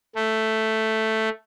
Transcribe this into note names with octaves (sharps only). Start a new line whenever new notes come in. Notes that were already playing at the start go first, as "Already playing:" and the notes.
A3